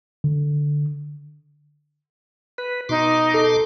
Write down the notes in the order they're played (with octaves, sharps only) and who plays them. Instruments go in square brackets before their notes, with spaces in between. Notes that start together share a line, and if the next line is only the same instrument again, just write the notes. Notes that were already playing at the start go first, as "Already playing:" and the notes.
[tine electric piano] D3
[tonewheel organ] B4
[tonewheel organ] B2 C6 D6 [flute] D#4
[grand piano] A4